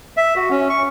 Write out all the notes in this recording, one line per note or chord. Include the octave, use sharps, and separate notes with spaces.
E5
F#4
C#4
C#6